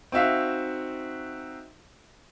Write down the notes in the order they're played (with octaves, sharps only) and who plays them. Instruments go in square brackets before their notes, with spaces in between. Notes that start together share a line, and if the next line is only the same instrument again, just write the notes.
[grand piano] C4 D#4 F#4 E5 F5